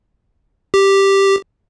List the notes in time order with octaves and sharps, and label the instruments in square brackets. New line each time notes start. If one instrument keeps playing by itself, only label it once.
[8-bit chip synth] G4